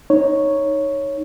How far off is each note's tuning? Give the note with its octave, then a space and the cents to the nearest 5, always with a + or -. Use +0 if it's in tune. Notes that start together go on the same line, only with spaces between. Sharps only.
D#4 +0 C#5 +0